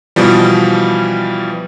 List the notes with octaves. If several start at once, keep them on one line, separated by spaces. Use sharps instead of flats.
B2 E3 F3 G3